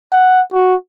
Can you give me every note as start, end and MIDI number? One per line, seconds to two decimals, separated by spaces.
0.12 0.41 78
0.53 0.75 66